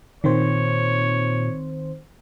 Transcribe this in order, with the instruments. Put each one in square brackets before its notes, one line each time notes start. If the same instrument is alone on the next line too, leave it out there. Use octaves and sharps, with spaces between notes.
[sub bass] A#2 [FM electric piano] D#3 C4 C5 [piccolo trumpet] C#5